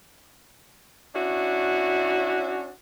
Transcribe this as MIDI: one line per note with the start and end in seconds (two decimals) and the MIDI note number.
1.15 2.68 61
1.15 2.68 62
1.15 2.68 64
1.15 2.68 66